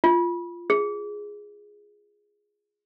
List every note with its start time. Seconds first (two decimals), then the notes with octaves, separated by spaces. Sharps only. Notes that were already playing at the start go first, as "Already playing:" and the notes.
0.04 F4
0.70 G#4